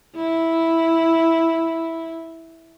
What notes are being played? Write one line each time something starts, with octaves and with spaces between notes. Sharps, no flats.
E4